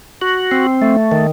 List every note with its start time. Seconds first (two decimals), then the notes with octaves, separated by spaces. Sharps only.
0.22 F#4
0.51 C4
0.82 A3
1.12 D#3